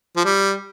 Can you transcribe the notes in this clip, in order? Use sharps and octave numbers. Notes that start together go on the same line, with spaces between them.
F3
G3